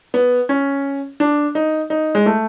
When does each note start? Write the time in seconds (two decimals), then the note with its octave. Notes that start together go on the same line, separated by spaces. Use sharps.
0.14 B3
0.49 C#4
1.20 D4
1.55 D#4
1.90 D#4
2.15 G#3
2.26 A3